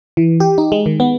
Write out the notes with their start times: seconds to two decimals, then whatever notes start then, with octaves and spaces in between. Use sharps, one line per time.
0.17 E3
0.40 G4
0.58 D#4
0.72 G#3
0.86 D#3
1.00 B3